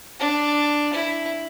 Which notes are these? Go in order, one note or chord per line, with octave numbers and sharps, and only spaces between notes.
D4
E4